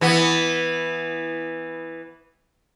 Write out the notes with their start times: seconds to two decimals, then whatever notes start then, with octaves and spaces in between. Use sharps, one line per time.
0.01 E3 B3